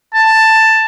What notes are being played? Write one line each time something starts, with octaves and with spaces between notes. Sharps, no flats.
A5